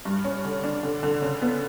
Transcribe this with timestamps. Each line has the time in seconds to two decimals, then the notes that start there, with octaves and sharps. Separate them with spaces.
0.05 G2
0.24 C#4
0.44 D3
0.64 D4
0.83 D3
1.03 D3
1.22 C#3
1.42 B3